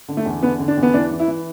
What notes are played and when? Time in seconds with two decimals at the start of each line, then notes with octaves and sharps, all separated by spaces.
0.08 D3
0.17 A3
0.26 E2
0.42 D3 B3
0.59 D3
0.68 D4
0.77 E2
0.83 B3
0.94 E3 D4
1.11 E3
1.20 E4
1.28 E3